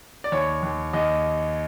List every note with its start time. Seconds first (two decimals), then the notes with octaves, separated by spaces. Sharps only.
0.24 D5
0.32 D#2 C#5
0.63 D#2
0.93 D#2 D#5